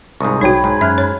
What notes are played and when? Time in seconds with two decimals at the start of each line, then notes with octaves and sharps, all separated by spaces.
0.20 C2 G#2 F4 C#6 D#6
0.41 B1 D#4 F#4 C#5 G5 B5 G#6
0.64 G#2
0.81 F#2 E5 F6 F#6
0.98 C#5